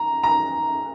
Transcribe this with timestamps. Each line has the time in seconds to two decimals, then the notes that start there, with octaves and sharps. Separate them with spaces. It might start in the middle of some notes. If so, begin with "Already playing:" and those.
Already playing: A#5
0.23 A#5